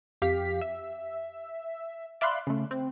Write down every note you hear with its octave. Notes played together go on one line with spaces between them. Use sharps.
F2 G4 F5 B6
E5
D5 E5 F5 B5 C6 F#6
C#3 A3
C4